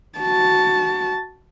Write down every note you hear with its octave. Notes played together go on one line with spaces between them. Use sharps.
F#4 A5